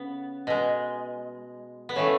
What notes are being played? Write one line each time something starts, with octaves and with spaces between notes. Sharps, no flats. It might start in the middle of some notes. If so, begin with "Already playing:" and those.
Already playing: C#3 B3
B2 G#3
B3
C#3 E3 A3 C#4